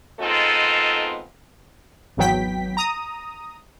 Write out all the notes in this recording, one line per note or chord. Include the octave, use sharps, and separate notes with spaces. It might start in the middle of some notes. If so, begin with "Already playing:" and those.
G#3 B3 C4 D#4 F4 A4
G#1 E2 F#3 B3 G5 B6
A#5 D#6